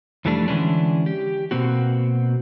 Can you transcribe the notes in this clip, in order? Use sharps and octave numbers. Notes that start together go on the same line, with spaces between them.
F2 E3 G3 A3 D4
D3 E3 G#3 C#4 D4
G4
B2 A#3 C4 F#4